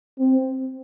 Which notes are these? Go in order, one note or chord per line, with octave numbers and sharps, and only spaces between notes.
C4